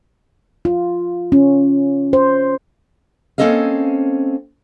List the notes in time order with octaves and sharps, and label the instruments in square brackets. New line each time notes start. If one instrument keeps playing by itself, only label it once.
[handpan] F4
C#4
C5
[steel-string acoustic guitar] A#3 C4 C#4 A4 D#5 F5